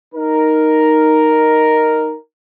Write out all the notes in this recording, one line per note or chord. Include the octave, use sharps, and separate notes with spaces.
D#4 A#4